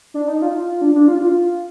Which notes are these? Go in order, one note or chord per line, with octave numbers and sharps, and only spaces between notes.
D4
D#4
F4
D4
D4
F4
F4